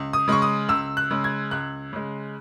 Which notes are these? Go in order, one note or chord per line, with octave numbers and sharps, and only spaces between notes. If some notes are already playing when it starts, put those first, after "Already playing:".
Already playing: C#2
D#6
C#3 G#3 C#6
D#6
C#2 E6
F#6
C#3 G#3
G#6
C#2 F#6
C#3 G#3